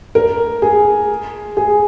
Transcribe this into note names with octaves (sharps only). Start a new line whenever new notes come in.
A#4
G#4
G#4